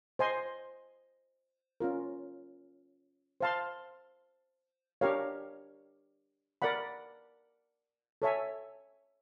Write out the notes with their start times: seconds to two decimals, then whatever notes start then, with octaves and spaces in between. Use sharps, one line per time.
0.19 C5 D#5 G#5 C6
1.80 C#4 F4 A#4
3.41 C5 F5 A5 C6
5.01 D4 G4 A#4 C#5 F5
6.62 A#4 D5 F#5 B5
8.22 A4 C#5 E5 G#5